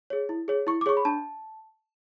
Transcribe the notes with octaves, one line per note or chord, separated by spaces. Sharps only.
G#4 C#5
E4
G#4 C#5
E4 C#6
D6
G#4 C#5 C#6
B5
D4 A5